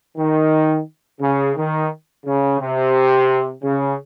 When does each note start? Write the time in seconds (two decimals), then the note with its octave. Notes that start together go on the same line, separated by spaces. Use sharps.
0.18 D#3
1.21 C#3
1.56 D#3
2.25 C#3
2.60 C3
3.63 C#3